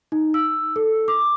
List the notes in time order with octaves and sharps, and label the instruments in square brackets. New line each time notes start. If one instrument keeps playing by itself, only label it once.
[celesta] D#4
E6
A4
D6